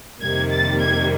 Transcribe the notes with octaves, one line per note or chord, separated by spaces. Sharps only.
F2 C3 D#3 G3 A#3 G#6
A6
G#6